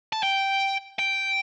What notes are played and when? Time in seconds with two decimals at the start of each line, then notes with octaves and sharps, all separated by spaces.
0.13 A5
0.23 G5
0.99 G5